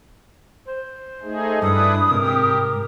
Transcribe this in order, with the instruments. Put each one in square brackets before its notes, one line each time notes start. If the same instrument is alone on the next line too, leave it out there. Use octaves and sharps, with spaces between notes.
[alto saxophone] C5
[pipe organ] A3 D#4 G#4
[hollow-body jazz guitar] G2 [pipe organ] D4 E4 B4 [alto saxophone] A4 [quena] D#6
[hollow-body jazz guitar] G#2 C3 [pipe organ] G4 [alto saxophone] A#4